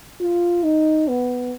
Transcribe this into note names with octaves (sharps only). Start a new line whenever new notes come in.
F4
D#4
B3